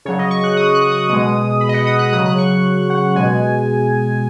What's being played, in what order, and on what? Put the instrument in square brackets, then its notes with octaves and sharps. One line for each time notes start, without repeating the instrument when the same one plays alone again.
[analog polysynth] C#3 F#3 C#5
D#5
C#6
F#6
D#6
F#6
D#6
B2 G#3 D#6
B5
D#5
F#5
D#6
F#6
C#3 F#3 D#6
F#6
C#6
C#6
F#5
B2 G#3 G#5